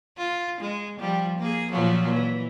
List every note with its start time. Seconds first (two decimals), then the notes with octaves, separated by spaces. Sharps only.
0.18 F4
0.60 G#3
0.99 F3 G3
1.39 A#3 G#4
1.71 A#2 F3 F#3
2.13 E3